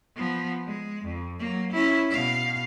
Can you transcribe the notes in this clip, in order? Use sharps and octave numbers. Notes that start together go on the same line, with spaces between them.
F3 B3
G#3
F2
F#3 A#3
C#4 E4
B2 F5